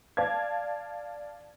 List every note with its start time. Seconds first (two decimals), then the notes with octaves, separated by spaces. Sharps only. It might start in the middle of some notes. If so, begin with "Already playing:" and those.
0.17 D5 F5 A5 G#6